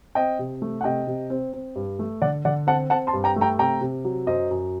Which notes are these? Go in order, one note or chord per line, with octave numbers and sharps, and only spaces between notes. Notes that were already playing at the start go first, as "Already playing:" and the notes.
C4 D#5 G5
C3
A3
F#5
C3 D#5 G5
C3
C4
C4
G2
A3
D3 D5 F#5
D3 D5 F#5
C4 F#5 A5
C4 F#5 A5
A5 C6
G2
G5 A#5
A3
G5 A#5
C3 G5 A#5
C3
F#3
F#2 C5 D#5
F#2